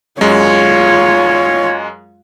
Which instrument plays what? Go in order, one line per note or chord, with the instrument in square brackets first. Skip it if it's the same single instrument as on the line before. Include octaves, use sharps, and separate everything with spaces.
[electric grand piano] F#2 G#3 [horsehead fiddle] F4 C#5